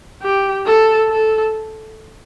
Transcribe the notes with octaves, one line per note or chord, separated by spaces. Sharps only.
G4
A4
A4